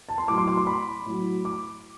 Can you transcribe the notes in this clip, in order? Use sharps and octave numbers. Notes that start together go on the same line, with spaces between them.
A5
C6
A2 F#3 D6
C6
D6
C6
B5
A2 F#3
D6